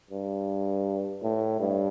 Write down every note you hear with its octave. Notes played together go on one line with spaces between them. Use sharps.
G2
A2
G2